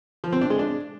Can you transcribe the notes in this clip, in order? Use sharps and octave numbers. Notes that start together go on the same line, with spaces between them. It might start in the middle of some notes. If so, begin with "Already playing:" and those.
F3
C4
D4
G#3
D4